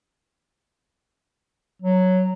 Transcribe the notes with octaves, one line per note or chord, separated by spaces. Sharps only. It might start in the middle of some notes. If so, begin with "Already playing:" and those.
F#3